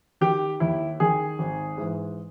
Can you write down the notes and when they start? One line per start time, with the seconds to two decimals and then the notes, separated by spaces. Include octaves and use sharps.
0.21 D#3 G4
0.60 D#2 E4
1.00 D#3 G#4
1.39 G#1
1.78 G#2 E3